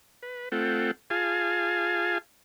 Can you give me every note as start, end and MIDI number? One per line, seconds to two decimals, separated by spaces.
0.23 0.49 71
0.52 0.91 57
0.52 0.91 60
0.52 0.91 65
0.52 0.91 69
0.52 0.91 78
0.52 0.91 79
1.10 2.18 65
1.10 2.18 68
1.10 2.18 77
1.10 2.18 80
1.10 2.18 81